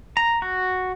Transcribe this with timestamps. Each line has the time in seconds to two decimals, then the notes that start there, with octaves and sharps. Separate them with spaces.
0.17 A#5
0.42 F#4